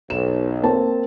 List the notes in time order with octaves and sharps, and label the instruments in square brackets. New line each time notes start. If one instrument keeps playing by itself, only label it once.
[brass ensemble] B1 [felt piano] E7
[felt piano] A#3 C4 A5